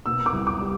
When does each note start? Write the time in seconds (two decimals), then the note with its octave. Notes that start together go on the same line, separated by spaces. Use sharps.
0.06 B2 E6
0.26 D6
0.33 C2
0.47 D6
0.60 G3